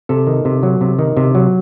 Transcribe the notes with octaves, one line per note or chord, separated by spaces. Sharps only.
C3 A4
D#3
C3
F#3
C3
D#3
C3
F#3